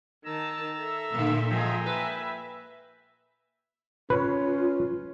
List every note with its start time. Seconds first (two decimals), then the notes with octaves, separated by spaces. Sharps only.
0.25 D#3 A5 A#5 E6
0.79 A4 E5
1.15 A#2 D3 A#3
1.50 F3 G#3 G5 G#5 A#5
1.86 B4 E5
4.10 C#4 F4 B4